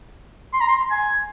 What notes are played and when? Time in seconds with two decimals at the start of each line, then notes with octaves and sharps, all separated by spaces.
0.53 C6
0.60 A#5
0.68 C6
0.91 G#5